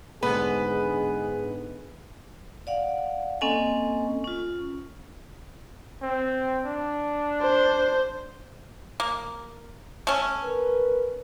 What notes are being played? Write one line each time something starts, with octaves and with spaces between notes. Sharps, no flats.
G#2 D3 G#3 B3 G#4 B4
D5 F5 F#5
A#3 C4 C#4 A4 D#5 G#5
C#4 F4
C4
D4
C5
A#3
A3 C#4
A#4 B4